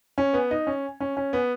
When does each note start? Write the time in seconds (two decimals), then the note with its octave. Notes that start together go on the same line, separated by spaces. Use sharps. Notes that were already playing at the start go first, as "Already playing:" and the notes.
0.18 C#4
0.33 B3
0.51 D#4
0.67 C#4
1.00 C#4
1.17 C#4
1.33 B3